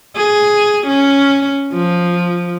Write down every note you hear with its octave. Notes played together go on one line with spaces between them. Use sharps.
G#4
C#4
F3